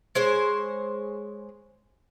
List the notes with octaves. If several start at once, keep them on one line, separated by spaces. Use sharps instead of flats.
G#3 C5 C#5